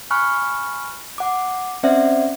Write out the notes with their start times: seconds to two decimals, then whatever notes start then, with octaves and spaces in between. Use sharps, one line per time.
0.11 G#5 B5 C#6 F6 F#6
1.18 F#5 D6
1.83 C4 C#4 C5 D5 E5 F#5